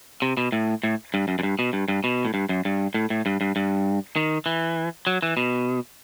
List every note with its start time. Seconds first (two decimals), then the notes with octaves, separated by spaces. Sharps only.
0.22 C3
0.37 B2
0.52 A2
0.83 A2
1.14 G2
1.28 F#2
1.39 F#2
1.43 G2
1.59 B2
1.73 G2
1.88 G2
2.04 B2
2.25 A2
2.34 G2
2.49 F#2
2.65 G2
2.94 A2
3.10 A2
3.26 G2
3.41 G2
3.56 G2
4.16 D#3
4.46 E3
5.07 F#3
5.22 E3
5.37 B2